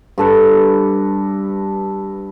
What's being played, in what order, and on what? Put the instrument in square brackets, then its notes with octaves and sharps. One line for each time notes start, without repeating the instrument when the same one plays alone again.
[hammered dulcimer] G2 A4 B4